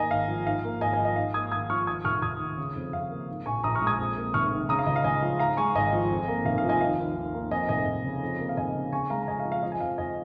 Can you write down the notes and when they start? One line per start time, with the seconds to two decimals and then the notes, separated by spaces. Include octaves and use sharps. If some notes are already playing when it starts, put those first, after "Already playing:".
Already playing: G#2 D#3 A#3 D#5 G#5 A#5
0.11 G#1 F5
0.28 F3
0.46 G#2 F5
0.64 A#3
0.81 G#1 D#5 G#5
0.94 D#5 G#5
0.99 F3
1.05 D#5
1.16 G#2 F5
1.34 A#3 D#6 G#6
1.52 G#1 D#6 G#6
1.69 F3 C#6 F6
1.87 D#2 D#6 G#6
2.05 F1 C#6 F6
2.22 F1 D#6 G#6
2.40 D#3
2.58 C#3
2.75 F2
2.93 F2 F5
3.10 A#3
3.28 G#2
3.46 A#1 G#5 C#6
3.64 A#1 A#5 D#6
3.75 C#6 F6
3.82 G#3
3.87 D#6 G#6
3.98 F2
4.17 A#3
4.34 F1 C#6 F6
4.52 D#3
4.69 C#3 A#5 D#6
4.79 F5
4.86 C#2 D#5
4.96 F5
5.04 C#2 D#5 G#5
5.22 F3
5.39 G#2 F5 A#5
5.57 G#3 G#5 C#6
5.75 G#1 D#5 G#5
5.93 F3
6.10 F2
6.28 A#3
6.45 F1 F5
6.58 F3 F5
6.69 D#5 G#5
6.81 D#3 F5
6.99 D#2
7.16 D#2
7.34 A#3
7.51 F2 D#5 G#5
7.69 F1 D#5 G#5
7.87 F1
8.05 C#3
8.23 F2
8.39 A#3
8.49 F5
8.57 F1 D#5 G#5
8.75 C#3
8.92 C#3 G#5 C#6
9.10 G#3 F5 A#5
9.23 A#5
9.28 F2 D#5 G#5
9.40 F5
9.45 F3
9.52 F5
9.63 F3 D#5
9.72 G#5
9.81 F2 F5
9.98 F2 D#5 G#5